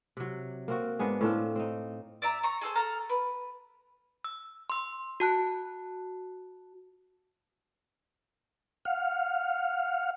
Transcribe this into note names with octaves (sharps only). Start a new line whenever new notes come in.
C3 F#3
A#3 C4 F#4
G#2 B3 D4 G#4
A2 C4 D4 F4
C4 D#4
D5 E5 A#5
A#5 C#6
G#4 A4 C5
A4 A#5 F6
B4
E6
C6 E6
F#4 A5 F#6
F5 F#5 F6